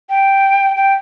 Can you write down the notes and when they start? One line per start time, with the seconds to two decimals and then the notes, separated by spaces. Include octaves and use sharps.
0.09 G5
0.76 G5